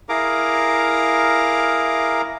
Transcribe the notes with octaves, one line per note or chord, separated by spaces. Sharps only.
E4 G#4 A#4 F5 A#5 D6